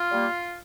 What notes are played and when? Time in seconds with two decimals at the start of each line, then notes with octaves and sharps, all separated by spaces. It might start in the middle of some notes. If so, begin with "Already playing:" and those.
Already playing: F4
0.10 G3 A#3